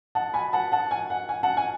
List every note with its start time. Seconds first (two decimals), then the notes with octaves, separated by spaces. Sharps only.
0.15 F#5 A5
0.34 G#5 B5
0.53 F#5 A5
0.72 F#5 A5
0.91 G#5
1.10 F#5
1.29 G#5
1.43 F#5 A5
1.57 G#5